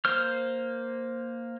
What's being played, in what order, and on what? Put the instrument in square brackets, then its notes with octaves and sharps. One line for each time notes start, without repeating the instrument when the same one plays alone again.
[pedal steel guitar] A#3 C5 F6